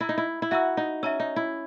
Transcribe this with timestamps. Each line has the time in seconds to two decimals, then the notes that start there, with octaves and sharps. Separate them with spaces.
0.01 E4 E5 A#5 E6
0.09 D#4
0.18 E4
0.42 E4
0.51 F#4 E5 A#5 E6
0.77 D#4
1.03 C#4 E5 A#5 E6
1.20 D#4
1.36 E4